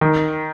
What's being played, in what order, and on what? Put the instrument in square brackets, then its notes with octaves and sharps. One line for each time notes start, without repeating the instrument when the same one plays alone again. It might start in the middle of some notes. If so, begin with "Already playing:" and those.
[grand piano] D#3